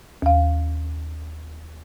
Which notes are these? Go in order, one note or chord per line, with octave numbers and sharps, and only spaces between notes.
D#2 F5